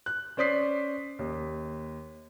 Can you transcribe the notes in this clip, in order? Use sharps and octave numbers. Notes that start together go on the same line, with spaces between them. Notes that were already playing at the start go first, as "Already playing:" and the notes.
F#6
C#4 C5 D5 D#6 B6 C7
D#2